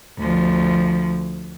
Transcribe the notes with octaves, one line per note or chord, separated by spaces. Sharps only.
D2 F3